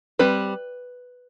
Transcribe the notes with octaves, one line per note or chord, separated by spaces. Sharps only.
G3 C4 B4